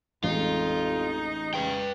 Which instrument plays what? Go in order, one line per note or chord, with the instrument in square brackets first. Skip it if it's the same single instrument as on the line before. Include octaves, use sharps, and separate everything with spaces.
[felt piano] A1 G#3 [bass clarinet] F2 [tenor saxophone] D#4 [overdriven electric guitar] F4
[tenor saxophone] C#3 [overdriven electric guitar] B4 G5